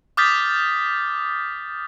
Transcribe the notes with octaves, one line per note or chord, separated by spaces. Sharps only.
D6 D#6 F6 G6 A6 B6